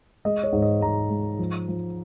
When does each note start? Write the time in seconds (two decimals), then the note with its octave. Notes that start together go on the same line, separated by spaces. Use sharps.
0.25 G#3 D#5
0.44 C#5
0.53 G#2
0.62 D#5
0.82 G#2 A#5
1.10 G#3
1.39 F3
1.68 F3